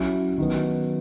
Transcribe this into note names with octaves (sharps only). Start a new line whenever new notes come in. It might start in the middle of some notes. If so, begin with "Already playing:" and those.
Already playing: F#3 C#4 E4
D#3 F#3 B3